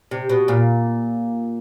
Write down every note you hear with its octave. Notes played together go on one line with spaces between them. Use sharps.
C3
B2
A#2